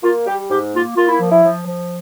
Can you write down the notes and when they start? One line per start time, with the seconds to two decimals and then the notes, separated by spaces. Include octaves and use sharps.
0.03 A#3 F4
0.27 G3 G4
0.50 G#2 G4
0.73 A#3 F4
0.97 A#3 F4
1.08 E4
1.20 F3
1.32 E4
1.43 F3
1.66 F3